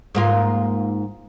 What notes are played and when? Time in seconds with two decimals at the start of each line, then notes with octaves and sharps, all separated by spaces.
0.15 G#2 A#3 F4